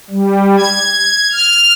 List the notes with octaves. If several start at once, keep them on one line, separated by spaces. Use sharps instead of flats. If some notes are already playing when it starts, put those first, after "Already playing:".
G3
G#6
F6